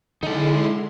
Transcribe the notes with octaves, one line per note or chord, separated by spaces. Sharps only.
D3 G#3 D#4 E4 A4 C6